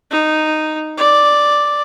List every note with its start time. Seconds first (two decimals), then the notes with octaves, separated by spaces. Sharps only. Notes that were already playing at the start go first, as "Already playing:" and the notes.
0.11 D#4
0.98 D5